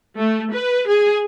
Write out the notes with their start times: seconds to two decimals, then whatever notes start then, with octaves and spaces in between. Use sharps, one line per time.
0.17 A3
0.53 B4
0.88 G#4